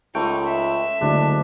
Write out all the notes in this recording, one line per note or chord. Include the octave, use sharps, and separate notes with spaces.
C#2 A3 D#4 G5
E5
F#1 D2 G#3 D4